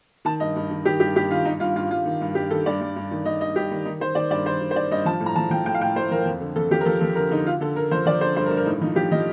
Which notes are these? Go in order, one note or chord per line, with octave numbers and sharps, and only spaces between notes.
D#3 A5
G2 D#5
G2
D#3
D#3 G4
G2 G4
G2 G4
D#3 F4
G2 D#4
G2 F4
G2 F4
G2 F4
D#3
G2
G2 G4
D#3 A4
G2 D5
G2
G2
D#3
D#3 D#5
G2 D#5
G2 G4
D#3
D#3 D#4
D#3 C5
D#3 D5
G2 D5
D#3 C5
D#3
C5
D#3 D5
G2 D#5
F3 A5
A2
A#5
F3 A5
F3 G5
A2 G5
F5
A2 G5
A2 C5
F3 A#4
F2
D3
F2 A4
F3 G4
A#4
F3 A4
F3 A4
D3 A#4
D3 D#4
D3 F4
D3 A4
D3 A#4
F3 C5
F3 D5
D3 C5
G2 C5
A#4
G2
A#4
A2 D#4
F3 D#4
F3 G4
F3 D#5